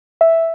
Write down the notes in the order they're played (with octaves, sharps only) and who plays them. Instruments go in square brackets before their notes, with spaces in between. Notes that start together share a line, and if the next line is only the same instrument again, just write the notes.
[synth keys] E5